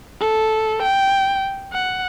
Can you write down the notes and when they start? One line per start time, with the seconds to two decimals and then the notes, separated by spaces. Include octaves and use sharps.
0.21 A4
0.83 G5
1.73 F#5